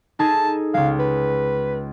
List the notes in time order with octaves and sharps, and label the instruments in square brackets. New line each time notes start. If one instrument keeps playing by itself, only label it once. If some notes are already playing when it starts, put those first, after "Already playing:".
[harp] D#4 G#4 A4 [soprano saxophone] A5
[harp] C#2 G#3 [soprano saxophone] F5
[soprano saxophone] B4